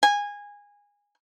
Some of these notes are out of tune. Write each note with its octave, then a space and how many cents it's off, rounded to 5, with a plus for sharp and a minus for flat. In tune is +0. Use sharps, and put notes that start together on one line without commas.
G#5 -20